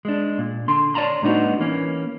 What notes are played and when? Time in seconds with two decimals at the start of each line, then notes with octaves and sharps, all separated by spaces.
0.05 G#3 D4
0.38 A#2
0.68 D3 C6
0.94 C#5 D5 F#5 A5 A#5 C6
1.22 A2 G3 B3 D4 D#4 F#4
1.60 E3 A#3 C#4